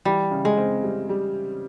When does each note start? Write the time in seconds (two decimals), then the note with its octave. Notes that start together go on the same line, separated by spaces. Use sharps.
0.05 E3 G3
0.31 C#3
0.45 G#3
0.57 C4
0.83 G3
1.09 G3